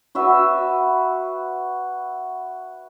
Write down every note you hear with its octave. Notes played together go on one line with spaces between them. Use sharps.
F#4 B4 E5